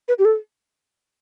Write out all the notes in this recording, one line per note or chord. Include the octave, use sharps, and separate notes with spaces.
B4
G4
A4